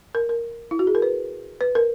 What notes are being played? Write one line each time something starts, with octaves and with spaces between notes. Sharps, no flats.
A#4
A#4
E4
F#4
G#4
A#4
B4
B4
A#4